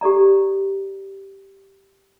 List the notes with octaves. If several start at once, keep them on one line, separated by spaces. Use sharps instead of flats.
G4 A4 D5 A#5